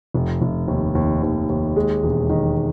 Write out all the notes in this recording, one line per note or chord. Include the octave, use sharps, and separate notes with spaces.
F1
F1
D#2
D#2
D#2
D#2
G#3
E1
D#3